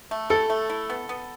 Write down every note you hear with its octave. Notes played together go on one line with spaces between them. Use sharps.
A3
E4 A4
A3
E4
B3
B3